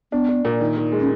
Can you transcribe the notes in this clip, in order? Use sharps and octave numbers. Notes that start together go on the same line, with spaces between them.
B3 D4
D4
A#2
D#3
D#3
G#3
C#4